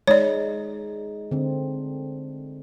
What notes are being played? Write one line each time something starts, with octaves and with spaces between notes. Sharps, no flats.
G#3 D#4 C#5 D5
D3 C4